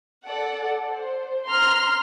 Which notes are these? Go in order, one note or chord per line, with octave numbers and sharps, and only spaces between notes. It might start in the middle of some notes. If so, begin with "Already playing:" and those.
A4 D5 F#5
C5
A#5 C6 F6